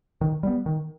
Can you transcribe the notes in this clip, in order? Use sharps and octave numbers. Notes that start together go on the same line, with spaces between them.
D#3
G3 B3
D#3